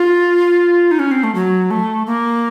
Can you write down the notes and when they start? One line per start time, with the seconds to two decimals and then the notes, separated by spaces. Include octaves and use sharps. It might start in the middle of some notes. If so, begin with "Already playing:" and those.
Already playing: F4
0.91 D#4
0.99 C#4
1.11 C4
1.23 A3
1.35 F#3
1.71 A3
2.07 A#3